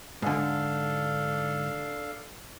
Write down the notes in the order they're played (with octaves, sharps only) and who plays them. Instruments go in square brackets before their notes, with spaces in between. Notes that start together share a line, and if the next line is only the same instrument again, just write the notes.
[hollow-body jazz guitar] G#2 D3 [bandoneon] D4 A4 F5